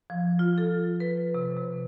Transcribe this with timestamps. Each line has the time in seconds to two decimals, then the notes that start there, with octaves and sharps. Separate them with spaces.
0.10 F3
0.39 F4
0.58 A4
1.00 B4
1.34 C3
1.56 C3